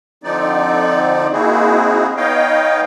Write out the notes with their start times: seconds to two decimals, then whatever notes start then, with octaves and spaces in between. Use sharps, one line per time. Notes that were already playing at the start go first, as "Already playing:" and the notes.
0.24 D3 F3 C4 D#4 D5
1.33 A#3 C4 D#4 E4 F#4 G#4
2.17 B3 D#4 C#5 D#5 F5 G5